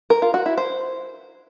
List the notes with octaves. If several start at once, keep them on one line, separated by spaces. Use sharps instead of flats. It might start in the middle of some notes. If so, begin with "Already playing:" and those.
A#4
F4
F#4
E4
C5